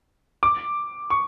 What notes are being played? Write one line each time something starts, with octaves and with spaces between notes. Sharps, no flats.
D6
C#6